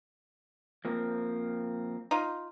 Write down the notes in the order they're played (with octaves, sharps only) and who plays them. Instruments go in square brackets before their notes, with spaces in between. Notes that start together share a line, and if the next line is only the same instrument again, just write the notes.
[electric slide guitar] F3 A#3 C4
[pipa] D#4 F4